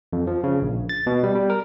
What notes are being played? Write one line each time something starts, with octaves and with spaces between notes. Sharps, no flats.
F2
F3
C#3
A#1
A6
B2
G3
G3
A#4